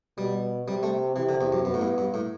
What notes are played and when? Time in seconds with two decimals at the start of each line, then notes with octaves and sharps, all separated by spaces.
0.18 B2 G3
0.68 C3 G3
0.83 A3
1.16 C3 E3
1.29 D3
1.41 E2
1.52 F#2
1.65 F#2 B3
1.74 A2
1.81 G2
1.98 G2
2.14 A2